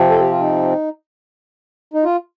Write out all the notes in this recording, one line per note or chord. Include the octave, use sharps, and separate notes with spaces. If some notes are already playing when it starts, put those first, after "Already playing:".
Already playing: C3 F3 C4
A4
G4
F4
D#4
D#4
F4